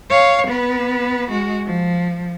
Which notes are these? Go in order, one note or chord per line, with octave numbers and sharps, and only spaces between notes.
C#5 F5
B3 B4
G#3 F#4
F3